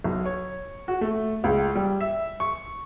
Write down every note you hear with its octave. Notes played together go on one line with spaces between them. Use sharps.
B1
C#5
F#4
A3
C#2
G3
E5
C#6